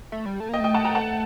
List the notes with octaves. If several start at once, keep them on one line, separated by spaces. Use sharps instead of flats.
A3
G3
A3
A#3 D#5 G5
A3 D#5 G5
F#5 A5
G5 A#5
F#5 A5